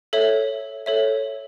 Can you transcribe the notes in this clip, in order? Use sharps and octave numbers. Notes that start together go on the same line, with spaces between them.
A4 C#5 E5
A4 C#5 E5